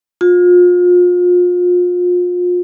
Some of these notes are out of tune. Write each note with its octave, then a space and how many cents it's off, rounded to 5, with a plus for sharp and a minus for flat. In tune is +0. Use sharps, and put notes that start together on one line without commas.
F4 +35